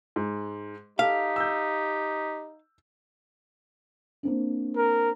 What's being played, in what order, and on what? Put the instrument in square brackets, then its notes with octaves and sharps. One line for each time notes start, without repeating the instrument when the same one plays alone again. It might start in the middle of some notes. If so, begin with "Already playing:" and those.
[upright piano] G#2
[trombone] D#4 [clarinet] G4 [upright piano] A4 [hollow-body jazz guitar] F5
[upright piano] E6 G6
[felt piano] A#3 C4 D4
[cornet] A#4